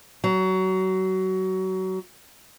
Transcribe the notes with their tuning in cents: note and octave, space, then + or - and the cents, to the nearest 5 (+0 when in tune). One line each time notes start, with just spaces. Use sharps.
F#3 +25